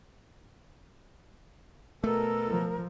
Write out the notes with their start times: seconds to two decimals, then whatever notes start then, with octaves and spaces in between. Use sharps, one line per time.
2.04 B2 A3 A4 A#4
2.49 F3